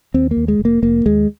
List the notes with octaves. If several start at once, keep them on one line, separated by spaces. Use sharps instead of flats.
D#2 C4
A#3
D#2
G#3
F1
A#3
F1 A#3
D#2 G#3